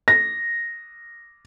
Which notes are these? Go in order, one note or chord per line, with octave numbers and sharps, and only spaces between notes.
A#6